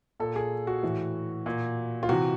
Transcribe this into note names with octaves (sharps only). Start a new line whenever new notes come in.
A#2 A4
G#4
F#4
A2 E3
A#2
F4
C3 E3 F#4